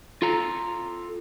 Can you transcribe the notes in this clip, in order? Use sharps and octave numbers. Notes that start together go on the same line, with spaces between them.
F4 A4 A#5